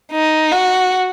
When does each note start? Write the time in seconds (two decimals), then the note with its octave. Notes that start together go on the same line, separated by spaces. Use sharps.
0.12 D#4
0.52 F#4